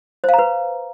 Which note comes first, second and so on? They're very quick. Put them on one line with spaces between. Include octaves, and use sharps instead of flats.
C5 F5 A#5 B4